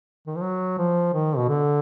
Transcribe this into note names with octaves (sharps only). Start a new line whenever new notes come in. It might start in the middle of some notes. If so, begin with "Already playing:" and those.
D#3
F3
F#3
F3
D#3
B2
D3